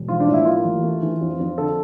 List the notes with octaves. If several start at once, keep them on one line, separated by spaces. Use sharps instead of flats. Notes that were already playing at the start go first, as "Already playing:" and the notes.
Already playing: E1
F3 F4
D4
A2
E4
A#3 F4
A1
A3
E3
F2
F2
D3 A4